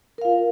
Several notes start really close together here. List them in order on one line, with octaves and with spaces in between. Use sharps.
A#4 F5 F4